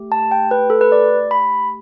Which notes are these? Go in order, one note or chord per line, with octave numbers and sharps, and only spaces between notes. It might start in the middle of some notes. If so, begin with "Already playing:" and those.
Already playing: A3 G4
A5
G5
B4
A4
B4
D5
B5